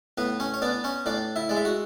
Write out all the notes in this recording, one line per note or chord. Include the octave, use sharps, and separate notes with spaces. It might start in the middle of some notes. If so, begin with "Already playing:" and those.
A2 B3 B4
C#4 C#5
C#5
B3 D4 D5
C#4 C#5
A2 D4 D5
E4 E5
G#3 D5
E5
F#4 F#5